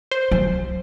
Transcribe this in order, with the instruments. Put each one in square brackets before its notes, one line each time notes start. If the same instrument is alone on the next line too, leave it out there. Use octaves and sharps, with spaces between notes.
[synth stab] C5
[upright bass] F#3